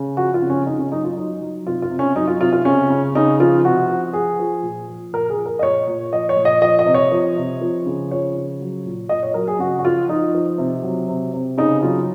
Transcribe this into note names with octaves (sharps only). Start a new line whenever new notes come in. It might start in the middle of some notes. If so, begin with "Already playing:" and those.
Already playing: C#3
F3 F#4
F4
C#3
C#4
C#3 D#4
C#4
F#3 D#4
F4
F#3 D#4
F#3
C3 F4
F4
C3
C#4
F#3 D#4
F4
C3 F4
F4
C#3 C#4
C#3
C#3 D#4
F3 F4
C3 F#4
F3
F3 G#4
F3
A#2
F3
A#2 A#4
G#4
F3
A#4
D#5
A#2 C#5
A#2
F3 D#5
C#5
A#2
D#5
F3 D#5
D#5
C3
C#5
F3
C3
F3
C#3
F3 C#5
C#3
F#3
A#2
A#2 D#5
C#5
F#3 A#4
G#4
C#3 F#4
F#4
F3 F4
F3 D#4
F3
C3
F#3
C3
C3
C#3 D#4
F#3 F4